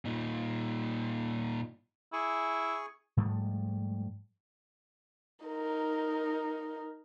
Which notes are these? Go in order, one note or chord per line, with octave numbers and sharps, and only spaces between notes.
A#2 D#4
E4 G#4 G#5 C#6
G#2 F3 G3 A3
D#4 A#4